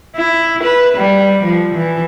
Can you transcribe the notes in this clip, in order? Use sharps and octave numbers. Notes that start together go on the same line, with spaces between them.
E4
B4
G3
F3
E3